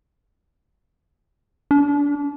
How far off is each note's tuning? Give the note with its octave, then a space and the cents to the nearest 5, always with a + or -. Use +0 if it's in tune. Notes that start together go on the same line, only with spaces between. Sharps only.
D4 -30